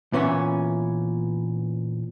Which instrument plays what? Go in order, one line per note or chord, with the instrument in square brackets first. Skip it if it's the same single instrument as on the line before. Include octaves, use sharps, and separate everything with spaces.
[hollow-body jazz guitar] A#2 E3 B3 C#4